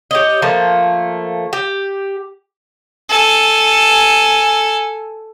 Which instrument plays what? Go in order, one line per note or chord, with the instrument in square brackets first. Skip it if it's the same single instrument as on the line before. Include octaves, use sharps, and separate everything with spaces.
[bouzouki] G4 C#5 D#5
F3 A3 A#3
G4
[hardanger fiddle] A4 G#5